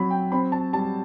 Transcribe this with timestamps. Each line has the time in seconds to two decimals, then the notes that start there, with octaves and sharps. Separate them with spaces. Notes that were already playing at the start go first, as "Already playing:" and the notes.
Already playing: F#3 C4 B5
0.10 G5
0.32 C4 B5
0.52 A5
0.73 G3 A5